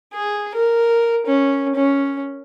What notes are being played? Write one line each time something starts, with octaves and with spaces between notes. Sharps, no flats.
G#4
A#4
C#4
C#4